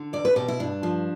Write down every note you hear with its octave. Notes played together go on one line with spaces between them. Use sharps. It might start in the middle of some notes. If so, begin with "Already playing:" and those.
Already playing: D3
E2 D5
B4
B2 G4
E4
G2 D4
F3